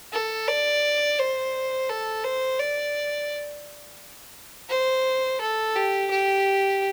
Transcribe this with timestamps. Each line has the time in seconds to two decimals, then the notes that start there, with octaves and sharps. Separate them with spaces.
0.12 A4
0.48 D5
1.19 C5
1.89 A4
2.24 C5
2.59 D5
4.70 C5
5.41 A4
5.76 G4
6.11 G4